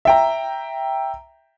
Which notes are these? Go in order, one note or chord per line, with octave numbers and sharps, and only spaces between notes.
E5 G5 A#5